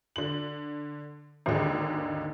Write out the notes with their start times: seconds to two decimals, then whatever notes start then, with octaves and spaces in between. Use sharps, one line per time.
0.16 D3 F#7
1.46 G#1 D#2 D3 G#3